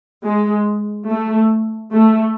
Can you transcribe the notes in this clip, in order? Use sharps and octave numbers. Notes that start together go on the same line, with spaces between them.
G#3
A3
A3